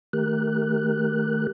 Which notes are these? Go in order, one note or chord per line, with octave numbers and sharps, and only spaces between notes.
D#3 A3 G4 A#4 F#6